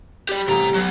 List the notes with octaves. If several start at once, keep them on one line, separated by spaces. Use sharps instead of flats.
G4 D5
A1 C3 G3 A#5
F#3 B3